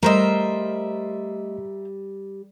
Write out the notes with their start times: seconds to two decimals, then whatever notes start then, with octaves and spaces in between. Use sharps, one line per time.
0.03 G3 A3 A#4 C5 D#5 E5